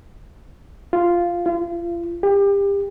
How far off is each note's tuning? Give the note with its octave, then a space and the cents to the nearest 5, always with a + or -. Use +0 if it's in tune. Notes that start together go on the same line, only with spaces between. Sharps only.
F4 -5
F4 -35
G4 +30